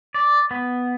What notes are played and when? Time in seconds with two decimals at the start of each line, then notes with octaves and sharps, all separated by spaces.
0.14 D5
0.51 B3